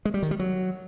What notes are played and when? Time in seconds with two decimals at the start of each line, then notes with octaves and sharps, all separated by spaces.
0.05 G#3
0.14 G3
0.22 D#3
0.31 G3
0.40 F#3